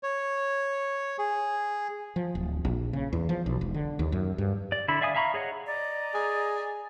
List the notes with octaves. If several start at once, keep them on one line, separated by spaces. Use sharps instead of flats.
C#5
G#4
F3
D1
A#1
C#3
E2
F3
B1
E1
D3
D#2
F#2
G2
D5
D3 E4 B5
D5 E5 F5 G#5 D#6
E5 F5 A#5 B5 C#6
G#4 C#5 D#5 F#5
D5 D#5 A#5
G#4